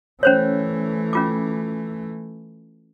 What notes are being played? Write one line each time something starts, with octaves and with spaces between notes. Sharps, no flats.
E3 A3 C#4 C5 C#5
C#4 F4 D6